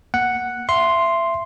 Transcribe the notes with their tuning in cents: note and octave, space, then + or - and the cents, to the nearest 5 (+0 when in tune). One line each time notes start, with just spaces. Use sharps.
A#3 +0 F#5 +0
E5 +25 C6 +0